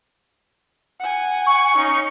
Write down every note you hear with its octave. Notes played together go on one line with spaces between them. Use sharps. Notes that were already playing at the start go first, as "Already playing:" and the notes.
F#5 G#5
C#6
C#4 D#4